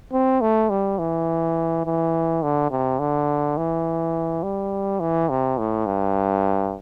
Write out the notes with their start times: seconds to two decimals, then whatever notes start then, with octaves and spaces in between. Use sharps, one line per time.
0.13 C4
0.42 A3
0.70 G3
0.99 E3
1.85 E3
2.43 D3
2.71 C3
3.00 D3
3.57 E3
4.43 G3
5.00 E3
5.29 C3
5.58 A2
5.86 G2